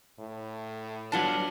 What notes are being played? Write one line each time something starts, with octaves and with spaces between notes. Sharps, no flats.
A2
F#3 G3 B3 D4 F4 A5